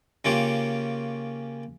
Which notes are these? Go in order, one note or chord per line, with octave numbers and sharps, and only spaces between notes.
C#3 A#3 C#4 F4 G4